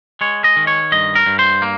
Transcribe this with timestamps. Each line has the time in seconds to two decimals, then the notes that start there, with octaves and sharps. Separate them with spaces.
0.21 G#3 C#5
0.44 D#5
0.56 D#3
0.67 C#5
0.92 G2 D#5
1.15 A#4
1.26 G2
1.39 C5
1.62 A#3